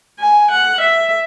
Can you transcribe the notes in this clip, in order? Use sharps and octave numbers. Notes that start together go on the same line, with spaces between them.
G#5
F#5
E5